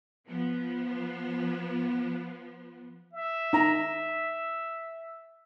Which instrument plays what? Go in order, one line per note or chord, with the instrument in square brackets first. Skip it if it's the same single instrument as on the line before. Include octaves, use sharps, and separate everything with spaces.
[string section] F3 B3
[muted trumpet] E5
[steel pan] D#4 A#5